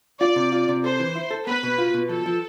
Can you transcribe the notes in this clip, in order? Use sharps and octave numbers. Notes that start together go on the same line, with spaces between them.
F4 D5
C3
F4
C3
A4 C5
E3
E4
A4
B3 B4
B2
F4
B2
F3 A4
F3